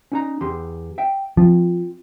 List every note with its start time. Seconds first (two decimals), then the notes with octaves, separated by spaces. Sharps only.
0.12 C#4 D#4 A#5
0.41 E2 G4 C6
0.98 E5 G5
1.37 F3 C4 F4